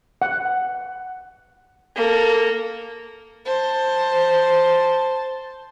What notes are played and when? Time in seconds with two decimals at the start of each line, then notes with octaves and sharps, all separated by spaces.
0.22 F#5
1.95 A#3 A4
3.46 C5 A5